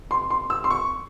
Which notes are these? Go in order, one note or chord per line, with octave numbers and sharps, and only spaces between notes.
C6
C6
E6
C6
C#6